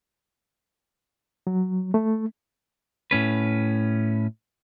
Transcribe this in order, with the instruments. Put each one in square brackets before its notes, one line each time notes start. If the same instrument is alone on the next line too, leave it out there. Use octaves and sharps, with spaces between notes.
[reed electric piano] F#3
A3
[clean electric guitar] A2 C#4 B4